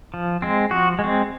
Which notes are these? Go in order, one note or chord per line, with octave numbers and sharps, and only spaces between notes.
F3
G#3 C4
F3 F#4
G#3
C4